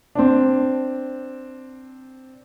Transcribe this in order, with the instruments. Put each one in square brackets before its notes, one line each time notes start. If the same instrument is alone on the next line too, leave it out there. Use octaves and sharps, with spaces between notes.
[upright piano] C4 D4